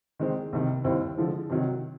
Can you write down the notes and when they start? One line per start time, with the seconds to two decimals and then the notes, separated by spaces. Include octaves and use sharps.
0.19 D#3 G#3 C4
0.53 C2 C3 D#3
0.84 D#2 D#3 G3 C4 E4
1.18 D3 F3 G#3
1.50 C3 D#3 F#3